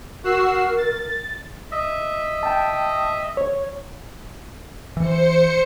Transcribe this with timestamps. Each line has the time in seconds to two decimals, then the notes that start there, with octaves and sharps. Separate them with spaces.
0.24 F#4 A#4 E6 C7
0.77 A6
1.72 D#5 E5
2.43 G5 A5
3.37 C#5
4.97 E3 C5 C#7